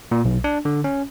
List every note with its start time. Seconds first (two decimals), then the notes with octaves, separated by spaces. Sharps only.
0.11 A#2
0.25 B1
0.44 D4
0.65 D3
0.84 C#4